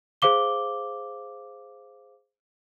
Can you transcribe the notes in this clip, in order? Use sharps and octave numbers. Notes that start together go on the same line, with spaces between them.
G#4 C5 F5 D6 G7